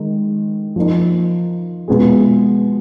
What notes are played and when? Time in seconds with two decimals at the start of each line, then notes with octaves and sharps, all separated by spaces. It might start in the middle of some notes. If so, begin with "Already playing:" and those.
Already playing: D#3 G#3 D#4
0.76 F3 A#3 D#4
1.88 B2 G#3 B3 F4 G#4